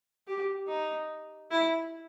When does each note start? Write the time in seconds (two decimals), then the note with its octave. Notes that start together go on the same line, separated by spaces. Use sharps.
0.28 G4
0.68 D#4
1.51 E4